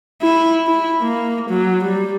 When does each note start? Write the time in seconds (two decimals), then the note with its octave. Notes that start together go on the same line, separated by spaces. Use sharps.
0.22 E4
0.67 E4
1.02 A#3
1.51 F#3
1.85 G3